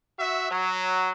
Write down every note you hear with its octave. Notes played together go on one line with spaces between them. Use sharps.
F#4 E5
F#3